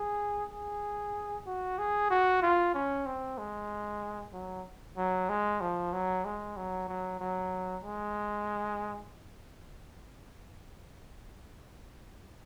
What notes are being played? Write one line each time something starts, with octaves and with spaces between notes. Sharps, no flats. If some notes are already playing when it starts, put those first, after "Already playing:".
Already playing: G#4
G#4
F#4
G#4
F#4
F4
C#4
C4
G#3
F#3
F#3
G#3
F3
F#3
G#3
F#3
F#3
F#3
G#3